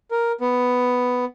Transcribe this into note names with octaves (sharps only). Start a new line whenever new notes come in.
A#4
B3